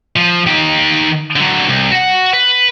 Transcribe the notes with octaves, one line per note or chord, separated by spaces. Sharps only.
F3
D#3 G4
D3 F#3
C2
F#4 F#5
B4